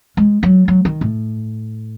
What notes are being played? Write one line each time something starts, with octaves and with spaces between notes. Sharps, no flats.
G#3
F#3
F#3
D#3
A2